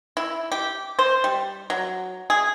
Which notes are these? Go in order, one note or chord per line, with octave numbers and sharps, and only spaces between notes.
E4
G4
C5
G3
F#3
G#4